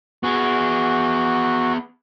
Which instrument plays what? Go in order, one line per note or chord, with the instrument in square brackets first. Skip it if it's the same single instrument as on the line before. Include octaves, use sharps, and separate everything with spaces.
[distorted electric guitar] B3 G#4 [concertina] F#4